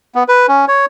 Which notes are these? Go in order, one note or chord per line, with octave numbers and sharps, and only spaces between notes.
B3
B4
C#4
C#5